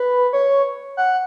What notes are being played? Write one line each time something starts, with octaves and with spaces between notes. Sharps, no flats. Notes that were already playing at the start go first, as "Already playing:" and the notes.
Already playing: B4
C#5
F#5